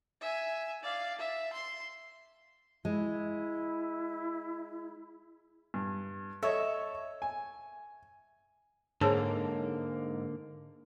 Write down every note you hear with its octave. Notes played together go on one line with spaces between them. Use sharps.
E5 G#5
D5 F5
E5
C6
G#3 E4
G2
A4 C#5 D#5 E5 C#6
G#5
G#2 D3 A#3 G#4 C#5 A5